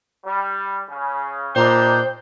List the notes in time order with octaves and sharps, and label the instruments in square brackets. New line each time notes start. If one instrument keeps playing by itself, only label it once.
[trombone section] G3
C#3
[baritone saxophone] A#2 [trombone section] G3 D4 D#4 [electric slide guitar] C5 [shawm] G5